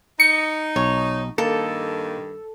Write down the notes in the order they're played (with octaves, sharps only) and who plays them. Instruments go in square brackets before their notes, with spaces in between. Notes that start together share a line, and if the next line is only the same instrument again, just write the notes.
[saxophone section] D#4 [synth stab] C#7
[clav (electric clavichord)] B1 [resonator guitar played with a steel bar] C#5
[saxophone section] G2 D#3 [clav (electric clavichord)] A#3 [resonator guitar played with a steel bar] A4